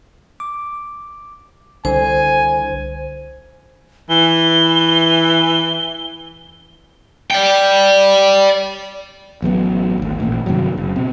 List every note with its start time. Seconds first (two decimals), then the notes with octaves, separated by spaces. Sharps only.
0.40 D6
1.85 C2 D3 C5 G#5
4.10 E3 G7
7.31 D5 G5
9.42 A1 F#3 G#3 B3
9.98 G#1 D2
10.20 A1 A#2
10.46 G2 C3 D#3 F#3
10.77 F#1
10.96 B2 C4